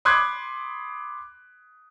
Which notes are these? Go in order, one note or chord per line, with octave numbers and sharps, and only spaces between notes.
B5 C6 D6 D#6 F#6 G#6